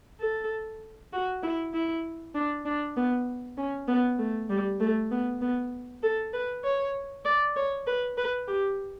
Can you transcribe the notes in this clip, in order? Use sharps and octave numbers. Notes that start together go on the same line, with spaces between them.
A4
F#4
E4
E4
D4
D4
B3
C#4
B3
A3
G3
A3
B3
B3
A4
B4
C#5
D5
C#5
B4
B4
G4